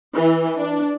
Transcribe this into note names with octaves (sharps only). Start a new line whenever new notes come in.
E3
D4